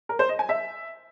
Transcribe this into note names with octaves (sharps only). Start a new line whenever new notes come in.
A#4
C5
D#5
G#5
E5